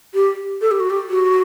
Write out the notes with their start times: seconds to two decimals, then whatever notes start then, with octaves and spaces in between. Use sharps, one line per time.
0.14 G4
0.61 A4
0.71 G4
0.80 F#4
0.90 G4
1.09 F#4